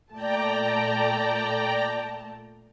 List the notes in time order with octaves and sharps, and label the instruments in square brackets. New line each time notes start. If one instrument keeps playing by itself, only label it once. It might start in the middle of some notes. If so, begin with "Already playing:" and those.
[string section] A#2 A3 A5 [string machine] D5 G5 A#5